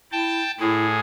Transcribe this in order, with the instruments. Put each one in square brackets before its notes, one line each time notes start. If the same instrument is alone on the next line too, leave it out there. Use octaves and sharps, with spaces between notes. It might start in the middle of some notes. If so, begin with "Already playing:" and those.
[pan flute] E4 [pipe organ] G5 A5
[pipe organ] A2 G#4 [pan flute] E4